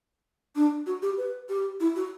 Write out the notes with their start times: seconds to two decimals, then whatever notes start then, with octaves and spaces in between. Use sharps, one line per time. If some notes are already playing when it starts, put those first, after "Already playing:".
0.56 D4
0.86 F#4
1.02 G4
1.18 B4
1.49 G4
1.80 E4
1.96 F#4